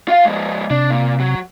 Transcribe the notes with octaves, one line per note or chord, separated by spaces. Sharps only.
F4 F5
F3 G#3
C3 D4
A#2
F#3